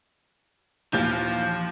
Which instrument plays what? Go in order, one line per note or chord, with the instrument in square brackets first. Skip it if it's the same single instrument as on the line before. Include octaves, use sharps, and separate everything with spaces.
[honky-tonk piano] D#2 F5 G6 [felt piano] A#2 E3 [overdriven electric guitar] F3